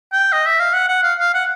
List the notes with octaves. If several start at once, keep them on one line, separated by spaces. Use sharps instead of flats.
G5
D#5
E5
F5
F#5
F#5
F5
F5
F#5